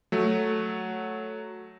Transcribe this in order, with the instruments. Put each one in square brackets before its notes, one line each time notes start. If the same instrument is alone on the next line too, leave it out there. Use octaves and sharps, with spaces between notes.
[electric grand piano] F#3 A3